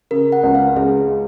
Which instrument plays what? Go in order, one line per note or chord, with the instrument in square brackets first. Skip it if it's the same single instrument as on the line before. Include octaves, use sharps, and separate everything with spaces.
[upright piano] C#3 [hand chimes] A#4
[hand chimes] F#5
[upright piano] C#2
[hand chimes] F5
[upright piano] C#2 [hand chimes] G#4